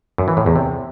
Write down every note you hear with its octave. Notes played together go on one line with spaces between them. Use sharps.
F#2
E3
A2
E2
C3